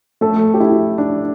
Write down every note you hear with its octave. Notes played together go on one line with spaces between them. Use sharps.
A3 A4
G4
E4
D4